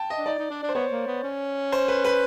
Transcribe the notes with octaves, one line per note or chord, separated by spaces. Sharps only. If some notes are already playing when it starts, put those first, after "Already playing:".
Already playing: G5 A5
D#5
D4
D#4 D5
D#4
D4
D4
C5
B3 C#5
A#3
B3
C#4
C5
B4
B4